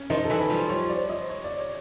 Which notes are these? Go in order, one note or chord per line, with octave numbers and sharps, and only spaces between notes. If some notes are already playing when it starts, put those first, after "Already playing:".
Already playing: C#4
D#3 F3 D#4
A4
E3 F#3
B4
F3 G3
C#5
D5
D#5
C#5
D5
C#5